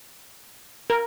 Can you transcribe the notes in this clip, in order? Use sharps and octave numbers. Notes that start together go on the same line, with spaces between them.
A#4